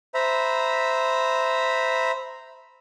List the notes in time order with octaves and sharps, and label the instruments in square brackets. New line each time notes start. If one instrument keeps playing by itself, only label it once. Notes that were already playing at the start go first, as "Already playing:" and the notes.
[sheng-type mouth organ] C5 E5 A#5 B5